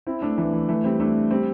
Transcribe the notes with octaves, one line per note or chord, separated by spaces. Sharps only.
C4 E4
A3 D4
E3 A3
E3
E3 A3
G3 C4
A3 D4
G3 C4